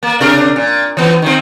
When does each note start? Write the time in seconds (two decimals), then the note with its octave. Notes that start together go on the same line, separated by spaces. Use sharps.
0.03 A#3
0.20 C3 D4 A#4
0.56 A#2
0.97 E3 B3
1.22 D#3 F3 C4